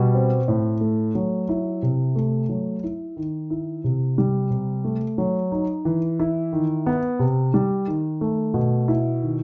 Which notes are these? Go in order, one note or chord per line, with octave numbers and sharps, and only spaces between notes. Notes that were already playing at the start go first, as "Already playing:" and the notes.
Already playing: B2 G3
C4
A2
A3
F#3
E4
C3
A3
F#3
E4
D#3
E4
C3
G3
C3
A3
F#3
D#4
E3
E4
D#3
B3
C3
G3
D#3
A3
B2
E4
D#3